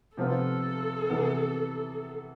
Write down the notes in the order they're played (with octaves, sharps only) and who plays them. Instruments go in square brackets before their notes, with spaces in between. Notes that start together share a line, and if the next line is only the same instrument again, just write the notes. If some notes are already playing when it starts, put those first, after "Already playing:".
[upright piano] C3 F3 B3 F4 [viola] A4
[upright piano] C3 E3 B3